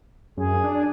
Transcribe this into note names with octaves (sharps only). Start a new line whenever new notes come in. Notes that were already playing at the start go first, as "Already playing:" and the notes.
F#2 G#4
D4